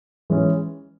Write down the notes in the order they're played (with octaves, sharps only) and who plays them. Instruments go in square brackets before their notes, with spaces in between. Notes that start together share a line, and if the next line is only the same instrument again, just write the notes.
[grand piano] E3 G#3 C#4